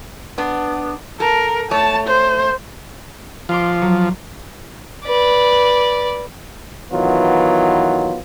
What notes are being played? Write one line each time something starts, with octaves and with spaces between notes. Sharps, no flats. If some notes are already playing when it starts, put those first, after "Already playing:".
B3 D4
A4 A#4
A3 C#5 A5
C5
F3 F5 C6 D6
F#3
B4 D5
D#3 E3 F#3 B3 F4